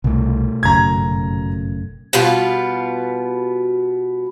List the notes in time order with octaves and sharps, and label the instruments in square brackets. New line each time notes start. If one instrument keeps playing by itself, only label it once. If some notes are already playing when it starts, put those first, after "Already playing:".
[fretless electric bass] C2 [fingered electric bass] B2 A3
[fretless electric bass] G1 F#2 C#3 [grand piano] A#5 G#6
[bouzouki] B2 G3 B3 F4